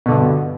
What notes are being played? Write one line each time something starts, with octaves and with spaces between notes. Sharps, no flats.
G2 B2 D3